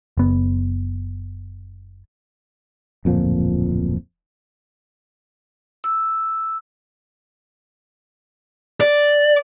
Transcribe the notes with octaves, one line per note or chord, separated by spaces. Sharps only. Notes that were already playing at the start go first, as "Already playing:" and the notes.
F#1 B3
D1 F2 A#2 F3
E6
D5